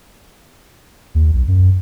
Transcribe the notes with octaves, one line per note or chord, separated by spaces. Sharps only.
D#2
B1
F#2